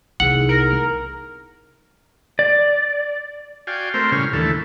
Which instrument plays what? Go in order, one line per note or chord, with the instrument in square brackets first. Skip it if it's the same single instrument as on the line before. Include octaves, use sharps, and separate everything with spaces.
[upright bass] C2 B3 [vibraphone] D#4 E4 G#4 [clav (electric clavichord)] F#5
[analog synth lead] A#4
[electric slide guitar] D5
[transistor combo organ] F#4 D5 F5 G5 G#5
A3 C4 A#4 C5
A2 C#3 G3 C#4 F6
D#2 D3 E3 A3 A4